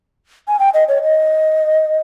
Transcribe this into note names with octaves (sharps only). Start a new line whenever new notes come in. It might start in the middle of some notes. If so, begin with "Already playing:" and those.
G#5
G5
D#5
C#5
D#5